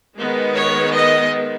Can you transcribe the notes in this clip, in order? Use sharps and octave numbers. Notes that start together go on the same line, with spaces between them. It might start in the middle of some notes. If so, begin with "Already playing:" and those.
D#3 G#3 B3
C#5
D#5